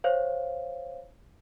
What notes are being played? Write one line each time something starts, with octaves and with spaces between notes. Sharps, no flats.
C5 C#5 F5